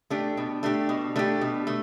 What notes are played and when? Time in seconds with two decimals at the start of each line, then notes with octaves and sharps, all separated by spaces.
0.10 A3 D4 G4
0.37 B2
0.63 A3 D4 G4
0.89 B2
1.16 A3 D4 G4
1.41 B2
1.67 A3